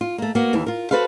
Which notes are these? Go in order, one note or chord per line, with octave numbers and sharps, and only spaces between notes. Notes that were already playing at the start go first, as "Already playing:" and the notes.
F4
A3 A#3
A#3 B3 F#4
D#2 E3
F4 A#4
F#4 A4 B4 C5 F5